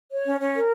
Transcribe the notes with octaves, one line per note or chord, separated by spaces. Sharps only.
C#5
C#4
C#4
A#4